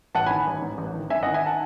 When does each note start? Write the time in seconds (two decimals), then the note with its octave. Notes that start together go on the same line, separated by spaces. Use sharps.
0.15 A1 F#5 A5
0.26 G#5 B5
0.30 D#3
0.47 A1
0.62 G#2
0.78 A1
0.95 D#3
1.10 G#1 E5 G#5
1.23 D#5 F#5
1.26 D#3
1.34 E5 G#5
1.46 F#5 A5